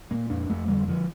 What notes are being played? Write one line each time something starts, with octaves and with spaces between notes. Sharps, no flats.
A#2 A#3
F2 D4
F2 A3
D3 G3
D3 F3